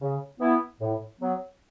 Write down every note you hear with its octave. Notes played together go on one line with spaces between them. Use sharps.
C#3
E3 B3 E4
A2
F#3 B3